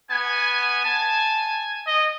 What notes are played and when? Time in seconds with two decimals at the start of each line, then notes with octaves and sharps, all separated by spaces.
0.11 B3 G#5
0.85 A5
1.87 D#5